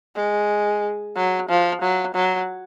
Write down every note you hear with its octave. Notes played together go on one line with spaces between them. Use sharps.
G#3
F#3
F3
F#3
F#3